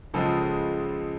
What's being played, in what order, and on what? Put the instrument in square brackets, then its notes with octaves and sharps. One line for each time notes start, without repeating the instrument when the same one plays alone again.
[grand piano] C#2 C#3 F3 G#3 A4